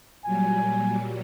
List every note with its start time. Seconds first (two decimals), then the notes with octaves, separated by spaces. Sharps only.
0.25 A#2 F#3 G3 G#5